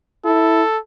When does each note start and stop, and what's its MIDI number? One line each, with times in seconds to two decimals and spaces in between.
0.25 0.63 64
0.25 0.77 69